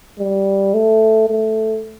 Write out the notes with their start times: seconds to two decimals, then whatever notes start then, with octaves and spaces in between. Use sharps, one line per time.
0.19 G3
0.74 A3
1.29 A3